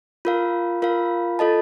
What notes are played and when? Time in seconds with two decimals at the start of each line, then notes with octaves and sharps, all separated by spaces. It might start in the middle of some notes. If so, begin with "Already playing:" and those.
0.25 F4 A#4 F5
0.82 F4 A#4 F5
1.39 F4 A4 D#5 A5